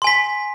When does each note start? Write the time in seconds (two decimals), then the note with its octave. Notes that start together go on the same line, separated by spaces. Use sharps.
0.02 C6
0.04 G#5
0.07 B6